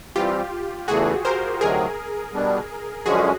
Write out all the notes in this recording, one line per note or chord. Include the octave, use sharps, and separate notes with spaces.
E3 G3 C4 F4 G4
E2 C#3 E3 A3 F#4 G#4
A#4 C5
D2 C3 D#3 F#3 G#4 A#4
B2 G3 B3 D4
F#2 D3 F3 G#3 C#4 F#4 G#4